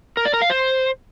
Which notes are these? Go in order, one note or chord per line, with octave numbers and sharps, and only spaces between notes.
A#4
D5
A#4
F5
C5